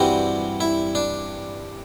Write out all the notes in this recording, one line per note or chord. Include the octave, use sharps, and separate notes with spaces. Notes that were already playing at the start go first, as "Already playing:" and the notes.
Already playing: G2 E3 G3 C4 F#4
E4
D4